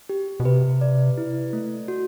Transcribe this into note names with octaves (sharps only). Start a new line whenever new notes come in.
G4
B2
C3 B4
D5
E4
A3
F#4